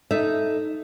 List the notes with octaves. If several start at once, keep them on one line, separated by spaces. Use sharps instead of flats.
D#4 A4 D#5 E5